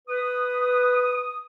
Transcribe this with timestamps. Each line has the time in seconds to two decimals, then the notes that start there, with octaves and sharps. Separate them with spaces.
0.08 B4 D#6